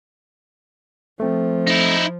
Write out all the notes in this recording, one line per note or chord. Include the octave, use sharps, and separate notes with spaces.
F3 A3 C4
D#4 E4